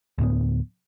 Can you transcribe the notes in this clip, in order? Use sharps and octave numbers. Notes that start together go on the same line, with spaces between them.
D2 A2 F#3 B3